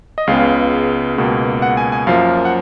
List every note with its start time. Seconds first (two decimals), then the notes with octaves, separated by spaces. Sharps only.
0.18 D#5
0.27 C#2 C#3 G#3 B3 F5
1.18 C#2 B2 A#3
1.62 F#5
1.77 G#5
1.92 G#5
2.07 F#2 F3 A#3 F5
2.45 F#5